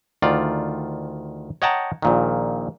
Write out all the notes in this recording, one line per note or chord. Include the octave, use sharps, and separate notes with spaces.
D2 D#3 F4 D5
C#5 D#5 F#5 G5 A5 A#5
A#1 A#2 D#3